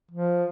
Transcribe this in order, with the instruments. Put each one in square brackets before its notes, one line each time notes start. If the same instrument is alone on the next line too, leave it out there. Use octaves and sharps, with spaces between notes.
[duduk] F3